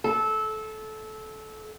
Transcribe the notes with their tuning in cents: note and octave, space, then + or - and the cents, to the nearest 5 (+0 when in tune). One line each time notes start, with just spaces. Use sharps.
A4 -20